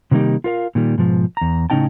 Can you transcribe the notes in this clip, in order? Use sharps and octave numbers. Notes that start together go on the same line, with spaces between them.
C3 D#3 G3 A#3 D#4 G4
F4 A#4 F5
A#2 D#3 G3
G#2 B2 F3
E2 A#5
A2 C#3 C#4 D#4 G5 A5